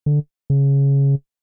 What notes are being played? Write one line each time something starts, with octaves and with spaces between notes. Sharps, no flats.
D3
C#3